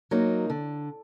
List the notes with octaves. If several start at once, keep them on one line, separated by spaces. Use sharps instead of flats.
F#3 A#3 D#4
D3